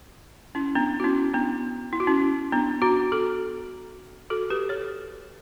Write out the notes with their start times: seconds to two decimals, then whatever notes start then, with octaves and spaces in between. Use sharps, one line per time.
0.55 C#4 E4
0.75 B3 D4
1.00 F#4
1.04 C#4 E4
1.34 B3 D4
1.93 E4
2.00 F#4
2.07 C#4 E4
2.52 B3 D4
2.82 D4 F#4
3.12 F#4 A4
4.30 F#4 A4
4.50 G4 B4
4.69 A4 C#5